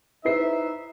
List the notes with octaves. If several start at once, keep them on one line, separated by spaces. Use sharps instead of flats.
D#4 E4 B4 C5 E5 C7